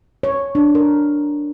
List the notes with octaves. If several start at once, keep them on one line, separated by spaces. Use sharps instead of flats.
C#5
D4
A#4